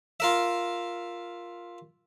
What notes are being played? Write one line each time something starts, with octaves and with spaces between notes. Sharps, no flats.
F4 A#4 E5